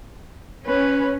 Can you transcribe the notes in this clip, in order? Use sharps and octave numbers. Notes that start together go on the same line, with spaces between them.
C#4 B4